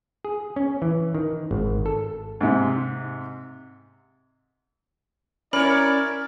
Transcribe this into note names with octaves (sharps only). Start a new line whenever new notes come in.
G#4
C#4
E3
D#3
G#1
A4
G#2 C3
C#4 E4 A#4 C#5 D5 B5